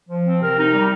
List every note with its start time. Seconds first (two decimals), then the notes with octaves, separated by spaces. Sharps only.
0.09 F3
0.25 C4
0.41 C3 A#4
0.57 D#4
0.73 G3